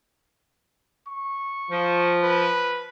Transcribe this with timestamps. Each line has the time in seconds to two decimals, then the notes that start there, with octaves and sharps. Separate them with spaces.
1.08 C#6
1.71 F3
2.23 B4